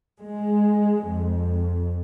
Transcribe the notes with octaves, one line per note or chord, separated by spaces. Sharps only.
G#3
F2